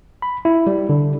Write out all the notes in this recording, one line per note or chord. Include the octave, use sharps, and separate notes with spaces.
B5
E4
G3
D3